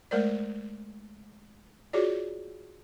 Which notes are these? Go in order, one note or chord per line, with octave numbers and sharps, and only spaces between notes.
G#3 A3 A#4 C5 D5
F4 F#4 G#4 C#5 D5